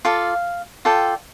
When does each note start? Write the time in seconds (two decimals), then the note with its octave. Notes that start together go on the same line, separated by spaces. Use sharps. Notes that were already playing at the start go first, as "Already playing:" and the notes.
0.05 F4 A4 D5 F5
0.85 F4 A4 D5 G5